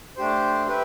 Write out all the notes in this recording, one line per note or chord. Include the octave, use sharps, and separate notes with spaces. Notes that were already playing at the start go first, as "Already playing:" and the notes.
A3 D4 G4 C5
G4 B4 E5